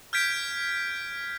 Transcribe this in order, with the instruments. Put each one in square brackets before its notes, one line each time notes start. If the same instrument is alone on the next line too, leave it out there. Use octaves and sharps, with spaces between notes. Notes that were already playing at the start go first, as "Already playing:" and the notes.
[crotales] F6 G6 G#6 B6 D7